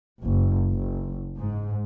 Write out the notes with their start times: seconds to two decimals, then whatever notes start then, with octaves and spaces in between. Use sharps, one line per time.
0.23 F#1
0.74 F#1
1.38 G#2